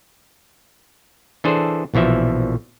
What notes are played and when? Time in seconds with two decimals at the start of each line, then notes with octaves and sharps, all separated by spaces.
1.44 E3 D4 G#4 A4 C5
1.94 A#1 B2 E3 F3 E5